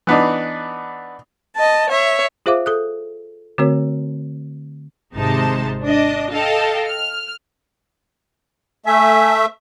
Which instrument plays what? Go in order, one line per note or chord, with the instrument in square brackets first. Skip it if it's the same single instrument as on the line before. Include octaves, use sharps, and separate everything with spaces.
[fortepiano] E3 B3 D4 D#4
[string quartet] D#5 A5
C#5 E5
[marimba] F4 G#4 C5 E5 F5 D6
A4 D#6 F#6
D3 A3 C4 F#4 A#4 C#5
[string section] G#1 C3 G#3 D#4 C5 A5
D4 D#5
A4 D#5 F5 G5 A5
F6
[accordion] A3 E5 [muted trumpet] G#5